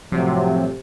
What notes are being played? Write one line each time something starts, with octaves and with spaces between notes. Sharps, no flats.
A2 C3 F3 F#3